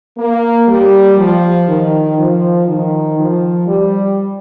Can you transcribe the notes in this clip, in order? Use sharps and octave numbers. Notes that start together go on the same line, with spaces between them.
A#3
G3
F3
D#3
F3
D#3
F3
G3